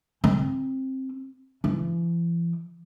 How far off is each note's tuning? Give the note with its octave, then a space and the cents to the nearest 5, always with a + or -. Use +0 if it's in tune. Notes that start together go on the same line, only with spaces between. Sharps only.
C4 +15
E3 +45